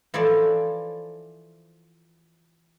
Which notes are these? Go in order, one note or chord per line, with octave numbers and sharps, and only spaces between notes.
E3 F3 A4 C#5 D5